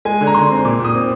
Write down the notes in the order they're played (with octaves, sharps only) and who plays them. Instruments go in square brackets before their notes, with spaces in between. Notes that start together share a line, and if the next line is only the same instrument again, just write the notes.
[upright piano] G#3 G#5
D3
A#5
D3 C6
C4
A#2 D6
A#2 D#6
C4